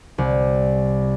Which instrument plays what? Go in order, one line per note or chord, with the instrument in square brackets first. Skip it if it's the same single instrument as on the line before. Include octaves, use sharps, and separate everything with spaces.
[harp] C2